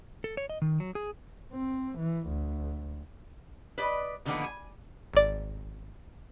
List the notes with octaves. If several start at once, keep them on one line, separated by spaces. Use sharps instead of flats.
A4
C#5
D#5
D#3
F#3
G#4
C4
E3
D2
B4 D5 D#5
B2 D3 D#3 F3 A#3 B3
G#5
G#1 D5